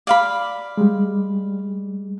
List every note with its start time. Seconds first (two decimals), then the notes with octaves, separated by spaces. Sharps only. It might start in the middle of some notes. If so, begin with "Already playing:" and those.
0.07 D5 F5 B5
0.77 G3 G#3